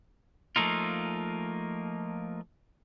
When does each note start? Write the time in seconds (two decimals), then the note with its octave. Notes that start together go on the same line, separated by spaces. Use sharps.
0.56 F3 A3 A#3 D#4 F4